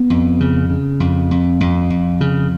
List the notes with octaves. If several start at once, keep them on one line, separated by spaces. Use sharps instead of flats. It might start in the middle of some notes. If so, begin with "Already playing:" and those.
Already playing: B3
F2
C#3
C#3
F2
F2
F2
F2
C#3